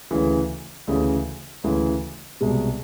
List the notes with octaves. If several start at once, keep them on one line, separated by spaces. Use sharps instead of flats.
D2 C#3 E3
D2 C#3 E3
D2 C#3 E3
C2 B2 G#3